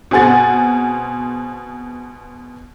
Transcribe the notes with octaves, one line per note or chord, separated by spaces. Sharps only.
B2 C4 G#4 F#5 A6